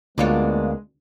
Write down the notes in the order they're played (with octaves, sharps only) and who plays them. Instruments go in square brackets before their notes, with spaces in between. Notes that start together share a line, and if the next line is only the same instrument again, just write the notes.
[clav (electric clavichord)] D2 [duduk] G#3 [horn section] A#3 B3 [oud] D4 F4 C#5